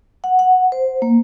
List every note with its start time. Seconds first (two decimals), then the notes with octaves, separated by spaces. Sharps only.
0.24 F#5
0.39 F#5
0.72 C5
1.02 A#3